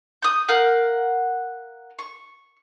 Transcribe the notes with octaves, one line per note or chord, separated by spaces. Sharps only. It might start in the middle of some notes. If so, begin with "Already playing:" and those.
D#6 G6
A#4 F5 F#5 G6
C#6